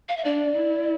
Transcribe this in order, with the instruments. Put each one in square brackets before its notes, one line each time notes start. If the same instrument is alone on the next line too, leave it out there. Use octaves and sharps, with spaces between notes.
[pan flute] F5
E5
[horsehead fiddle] D4 [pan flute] D5
[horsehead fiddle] E4